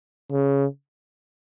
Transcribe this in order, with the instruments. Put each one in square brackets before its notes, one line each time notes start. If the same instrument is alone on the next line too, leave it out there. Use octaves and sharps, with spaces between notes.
[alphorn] C#3